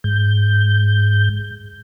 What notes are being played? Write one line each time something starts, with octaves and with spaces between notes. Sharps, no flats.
G#2 G6